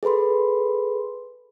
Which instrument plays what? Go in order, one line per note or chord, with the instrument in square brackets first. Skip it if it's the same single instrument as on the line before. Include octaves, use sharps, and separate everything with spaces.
[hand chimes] G#4 A4 B4 B5 C6